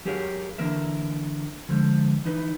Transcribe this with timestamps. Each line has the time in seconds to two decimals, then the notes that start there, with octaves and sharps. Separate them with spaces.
0.05 F#3 G4 G#4 A#4 C#5 F5
0.58 D3 E3 A#3 A#4 E5
1.69 D3 F3 G#3
2.24 E3 D#4 B4